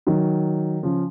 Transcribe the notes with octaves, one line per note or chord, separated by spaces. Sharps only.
D#3 F#3
C#3 F3